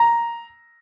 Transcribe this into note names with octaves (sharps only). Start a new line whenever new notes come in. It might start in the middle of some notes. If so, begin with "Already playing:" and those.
Already playing: A#5